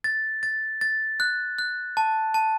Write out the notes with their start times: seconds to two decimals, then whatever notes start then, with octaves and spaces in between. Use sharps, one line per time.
0.04 A6
0.43 A6
0.81 A6
1.20 F#6
1.59 F#6
1.97 A5
2.34 A5